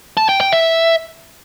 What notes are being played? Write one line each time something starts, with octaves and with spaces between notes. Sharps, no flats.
A5
G5
G5
E5